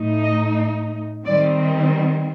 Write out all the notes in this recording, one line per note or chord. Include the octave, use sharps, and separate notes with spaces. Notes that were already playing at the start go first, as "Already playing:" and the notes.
Already playing: A2 A3 D#4
D#5
D#3 G3 C4 D5